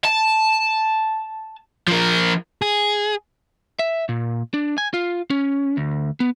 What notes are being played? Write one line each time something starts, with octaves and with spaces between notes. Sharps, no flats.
A5
F3 A#4
G#4
E5
A#2
D4
G#5
F4
C#4
D2
B3